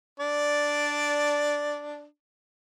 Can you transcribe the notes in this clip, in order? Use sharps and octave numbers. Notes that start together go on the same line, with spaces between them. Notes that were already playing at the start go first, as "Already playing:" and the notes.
D4 D5